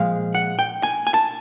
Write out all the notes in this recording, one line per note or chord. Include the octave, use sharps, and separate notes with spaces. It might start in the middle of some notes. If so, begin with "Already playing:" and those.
Already playing: A#2 F3 G#3 F5
F#5
G5
G#5
G#5
A5